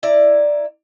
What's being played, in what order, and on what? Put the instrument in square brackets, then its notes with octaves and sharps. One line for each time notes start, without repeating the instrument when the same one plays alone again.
[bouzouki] E4 D5 A#5